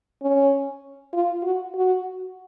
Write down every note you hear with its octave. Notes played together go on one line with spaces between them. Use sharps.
C#4
F4
F#4
F#4